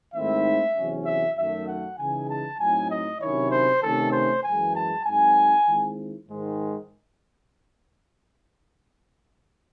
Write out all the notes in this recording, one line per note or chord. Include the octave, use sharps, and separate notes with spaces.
G#2 D#3 A3 C4 E4 E5
E2 C3 F#3 C#4
E5
F#2 D#3 F#3 A3 E5
F#5
C#3 E3 G#3 D#4 G#5
A5
A2 F#3 C4 D#4 G#5
D#5
C3 D#3 F#3 C#4 E4 C#5
C5
C3 D#3 A3 C#4 A4
C5
F#2 E3 G#3 G#5
A5
G#2 F#3 C4 G#5
D#3 G#3 C4 E4
G#2 D#3 G#3